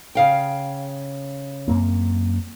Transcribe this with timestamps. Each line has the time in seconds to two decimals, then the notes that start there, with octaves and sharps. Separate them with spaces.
0.15 C#3 F5 G5
1.68 F#2 A#3 C4